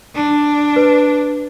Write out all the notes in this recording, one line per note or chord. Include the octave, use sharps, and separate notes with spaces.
D4
B4